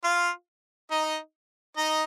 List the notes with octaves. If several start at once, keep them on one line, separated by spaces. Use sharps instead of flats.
F4 F5
D#4 D#5
D#4 D#5